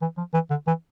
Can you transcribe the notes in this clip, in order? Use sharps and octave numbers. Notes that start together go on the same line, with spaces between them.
E3
F3
E3
D3
E3